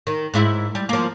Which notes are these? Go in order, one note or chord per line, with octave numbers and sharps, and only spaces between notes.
D#3
G#2 E4
G3
F3 A#3